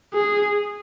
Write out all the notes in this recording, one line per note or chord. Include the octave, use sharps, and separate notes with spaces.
G#4